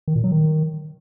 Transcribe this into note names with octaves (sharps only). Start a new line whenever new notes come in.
D#3
A#2
F#3
D#3